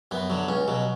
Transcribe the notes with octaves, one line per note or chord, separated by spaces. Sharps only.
F#2 B3
D3 F#3
C#2 C#4
B2 F#3